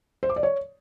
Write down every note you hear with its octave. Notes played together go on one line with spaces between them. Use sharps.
C5
D6
D5
C#5